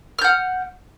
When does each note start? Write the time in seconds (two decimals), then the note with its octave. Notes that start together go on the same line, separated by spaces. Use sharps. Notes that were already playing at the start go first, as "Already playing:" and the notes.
0.19 F6
0.21 G6
0.24 F#5